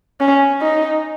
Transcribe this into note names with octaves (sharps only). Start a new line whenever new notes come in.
C#4
D#4